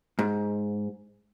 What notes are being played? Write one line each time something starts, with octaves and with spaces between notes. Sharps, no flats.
G#2